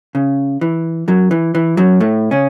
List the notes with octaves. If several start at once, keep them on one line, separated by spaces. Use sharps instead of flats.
C#3
E3
F#2 F#3
E3
E3
F#2 F#3
A2 A3
C#3 C#4